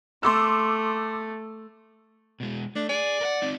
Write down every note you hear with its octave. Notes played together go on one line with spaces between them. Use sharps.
A3 C6 D6 E6
B2 G#3
A3 D4
G#4 D5
A#4 F#5
C4 D#4